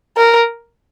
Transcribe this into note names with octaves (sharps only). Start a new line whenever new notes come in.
A#4